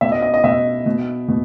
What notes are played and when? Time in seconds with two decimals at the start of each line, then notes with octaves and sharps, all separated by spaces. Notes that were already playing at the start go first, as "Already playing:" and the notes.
0.01 B2 E5
0.12 D#5
0.22 D#5
0.34 D#5
0.44 B2 E5
0.86 B2
1.28 B2